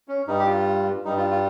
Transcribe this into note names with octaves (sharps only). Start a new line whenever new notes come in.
C#4
G2 G3 D#4
G4
F4
G2 G3 D#4
F4
F4